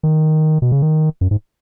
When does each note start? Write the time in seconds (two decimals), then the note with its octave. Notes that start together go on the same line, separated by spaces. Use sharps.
0.03 D#3
0.62 B2
0.72 C#3
0.82 D#3
1.21 F#2
1.31 G#2